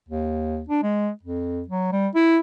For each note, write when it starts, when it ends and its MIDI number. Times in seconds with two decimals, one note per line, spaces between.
0.09 0.64 39
0.69 0.82 62
0.83 1.10 56
1.23 1.62 41
1.68 1.91 54
1.93 2.08 55
2.15 2.39 64